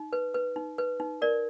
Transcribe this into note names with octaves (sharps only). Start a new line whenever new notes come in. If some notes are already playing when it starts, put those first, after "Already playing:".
Already playing: D#4
B4
B4
D#4
B4
D#4
A#4 D5